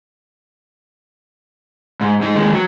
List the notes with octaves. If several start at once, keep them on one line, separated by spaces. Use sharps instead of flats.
G#2
G#2 D#4
D#2 G#3
F#3